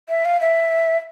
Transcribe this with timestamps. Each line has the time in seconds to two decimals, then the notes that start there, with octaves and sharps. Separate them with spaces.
0.09 E5
0.25 F5
0.41 E5